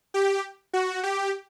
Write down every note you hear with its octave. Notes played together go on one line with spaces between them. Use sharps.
G4
F#4
G4